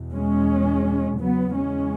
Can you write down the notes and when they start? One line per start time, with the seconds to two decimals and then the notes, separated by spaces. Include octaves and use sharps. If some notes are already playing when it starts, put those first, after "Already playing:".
Already playing: E2 B2
0.14 G#3 C#4
1.19 E2 C#3 F#3 B3
1.54 G#3 C#4